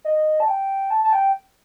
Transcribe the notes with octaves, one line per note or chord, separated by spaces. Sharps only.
D#5
A5
G5
A5
A5
G5